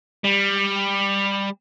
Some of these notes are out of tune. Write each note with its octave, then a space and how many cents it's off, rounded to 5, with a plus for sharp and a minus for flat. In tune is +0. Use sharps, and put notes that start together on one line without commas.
G3 +15